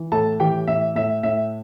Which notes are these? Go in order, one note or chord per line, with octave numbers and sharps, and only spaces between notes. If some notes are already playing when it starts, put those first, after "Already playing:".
Already playing: E3
A2 A4 A5
E3 G4 G5
A2 E5
A2 E5
A2 E5